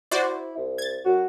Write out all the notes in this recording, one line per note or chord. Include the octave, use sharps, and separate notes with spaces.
E4 F#4 C5 D5
C2
G#6 A6
F#2 F#4